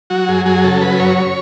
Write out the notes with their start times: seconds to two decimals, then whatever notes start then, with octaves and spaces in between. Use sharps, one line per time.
0.10 F#3 F#4
0.28 F#2 G#4
0.45 F#3 G#4
0.64 C#3 A4
0.81 F#3 B4
0.99 F#2 C#5